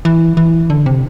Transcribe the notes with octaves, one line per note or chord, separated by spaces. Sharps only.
E3
E3
D3
C3